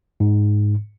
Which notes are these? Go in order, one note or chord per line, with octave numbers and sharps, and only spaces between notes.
G#2